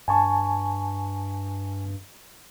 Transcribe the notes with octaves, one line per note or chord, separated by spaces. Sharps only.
G2 G#5 A5 C#6